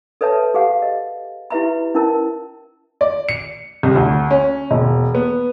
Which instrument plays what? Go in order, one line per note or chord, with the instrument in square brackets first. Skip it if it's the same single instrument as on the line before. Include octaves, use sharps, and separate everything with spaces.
[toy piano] A4 B4 C#5 E5 A5
G4 G#4 F5 F#5
D#5
E4 G4 B4 E5 A#5 B5
C#4 E4 A#4 A5
[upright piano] D5
C#7
C2
D2
C#4
E1
B3